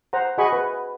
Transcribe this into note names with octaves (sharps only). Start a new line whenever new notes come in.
C5 F#5 A#5
F#4 G#4 D#5 G#5 B5 C#6
B4